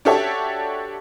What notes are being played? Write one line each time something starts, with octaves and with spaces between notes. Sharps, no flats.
D4 F#4 G4 A4 C#5 E5